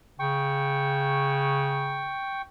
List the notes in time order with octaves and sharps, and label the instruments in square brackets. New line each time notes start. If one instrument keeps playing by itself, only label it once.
[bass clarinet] C#3 [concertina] G5 C#6